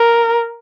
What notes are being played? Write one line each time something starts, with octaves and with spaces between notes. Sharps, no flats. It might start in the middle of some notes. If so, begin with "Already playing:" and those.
Already playing: A#4